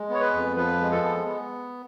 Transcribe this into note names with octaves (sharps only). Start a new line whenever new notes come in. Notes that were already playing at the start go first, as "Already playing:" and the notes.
Already playing: G#3
B3 C#5
B4
F2
F3 B4
G#3
A4
B3
B3